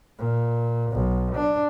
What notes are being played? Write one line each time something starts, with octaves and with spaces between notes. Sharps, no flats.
A#2
B1
D4